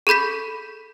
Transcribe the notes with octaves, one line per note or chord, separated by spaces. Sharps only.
G#4 A4 B5 G6 B6